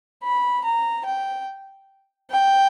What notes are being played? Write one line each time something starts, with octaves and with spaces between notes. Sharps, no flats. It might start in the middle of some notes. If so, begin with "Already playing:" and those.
B5
A#5
G5
G5